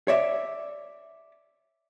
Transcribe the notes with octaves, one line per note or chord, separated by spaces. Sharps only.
C#5 D5 E5